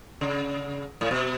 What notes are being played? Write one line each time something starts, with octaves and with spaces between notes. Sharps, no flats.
C#3
A2
B2